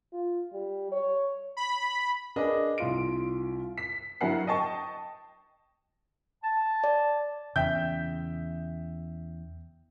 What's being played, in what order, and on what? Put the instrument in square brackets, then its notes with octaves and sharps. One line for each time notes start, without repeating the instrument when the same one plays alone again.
[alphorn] F4
G3
C#5
[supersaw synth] B5
[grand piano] D4 G#4 A#4 B4 D#5
C2 F4 D7
[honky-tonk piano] B6
G2 F#3 E4 A#4 F#5 C7
D#5 G5 A5 C#6
[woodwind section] A5
[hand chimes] D5
[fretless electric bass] E2 C#3 [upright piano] E5 G5 G6